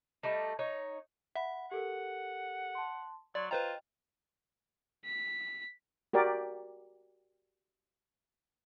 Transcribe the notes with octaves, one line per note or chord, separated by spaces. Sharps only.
G3 A3 D#4
D#4 C#5
E5 F#5 B5
G4 A4 A#4 F#5
A5 C6
F#3 D5 C6 G#6
F4 B4 C5 D#5 G5 A#5
B6
F#4 G4 A#4 D5